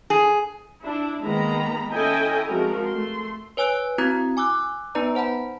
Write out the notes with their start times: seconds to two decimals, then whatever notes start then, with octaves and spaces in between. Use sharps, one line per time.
0.10 G#4
0.81 D4 E4
1.24 D#3 G#3 A#3 B3 A#5 B5
1.91 C#4 E4 A4 D#5 G5 G#5
2.47 F3 G#3 C4 F#4 A#4
2.87 A3 C6
3.57 B4 C#5 G#5 E6 F#6 D7
3.98 C4 E4 F#4 A#5 D#6 G#6
4.37 G#5 D6 E6 F#6
4.95 B3 D#4 B4 D5 A5 A#5
5.15 C5 F#5 A5 B5